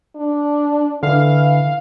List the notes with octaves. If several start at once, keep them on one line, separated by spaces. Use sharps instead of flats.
D4
D3 E3 F5